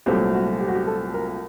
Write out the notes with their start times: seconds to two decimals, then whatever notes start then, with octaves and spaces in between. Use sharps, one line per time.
0.06 C2 A#2 F#3 A3 C4 G4
0.33 F#4
0.60 G4
0.68 F#4
0.75 G4
0.87 A4
1.14 A#4